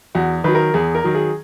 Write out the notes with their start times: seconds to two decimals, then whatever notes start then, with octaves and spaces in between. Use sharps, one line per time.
0.15 E2 F#4
0.44 D#3 F#3 B4
0.55 A#4
0.74 E2 G#4
0.95 A#4
1.04 D#3 F#3
1.15 G#4